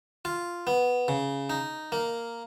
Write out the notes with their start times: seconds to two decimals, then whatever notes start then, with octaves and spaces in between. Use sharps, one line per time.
0.25 F4
0.67 B3
1.08 C#3
1.50 D#4
1.92 A#3